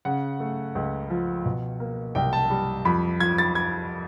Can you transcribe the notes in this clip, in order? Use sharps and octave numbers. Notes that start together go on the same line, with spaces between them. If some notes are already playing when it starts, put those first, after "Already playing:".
C#3 F#5
A3
C#2
F3
B2
A#3
C2 G5
A5
G3
F2 B5
F3 G#6
A6
G#6